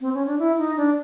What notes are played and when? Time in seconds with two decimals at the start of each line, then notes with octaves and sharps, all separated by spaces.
0.01 C4
0.14 C#4
0.26 D4
0.39 E4
0.58 D#4
0.77 D4